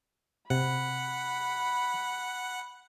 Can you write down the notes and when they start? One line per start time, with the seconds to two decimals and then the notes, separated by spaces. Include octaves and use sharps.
0.50 C3 F#5 B5